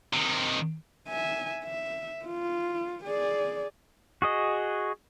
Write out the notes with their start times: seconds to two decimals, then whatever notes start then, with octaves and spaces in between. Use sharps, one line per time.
0.13 C3 D#3
1.08 E5 G#5
1.64 E5
2.25 F4
3.04 G#4 D5
4.22 F#4 G#4 D#5